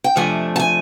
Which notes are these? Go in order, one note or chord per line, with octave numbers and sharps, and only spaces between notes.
G5
F2 C3 F3 A3 D4 G#5
A5
G#5